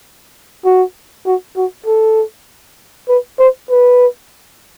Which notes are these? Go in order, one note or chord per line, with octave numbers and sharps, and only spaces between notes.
F#4
F#4
F#4
A4
B4
C5
B4